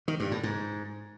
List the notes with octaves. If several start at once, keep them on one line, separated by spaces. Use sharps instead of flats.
D#3
G2
A2
G#2